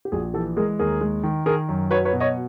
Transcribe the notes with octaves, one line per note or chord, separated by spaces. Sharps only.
G4
A#1 F#4 G#4
E3 G4 A4
G#3 G#4 A#4
D#2 G#4 A#4
G#3
D#3
D#3 G#4 A#4
F#2
F#3 B4 C#5
B4 C#5
B2
C#5 D#5